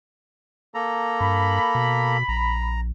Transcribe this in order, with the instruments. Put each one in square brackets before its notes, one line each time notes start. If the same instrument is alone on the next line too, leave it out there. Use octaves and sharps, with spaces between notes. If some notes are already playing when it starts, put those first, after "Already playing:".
[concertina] A#3 A4 A#5
[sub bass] G2 [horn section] B5
[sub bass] B2
[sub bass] A#1 [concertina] A#5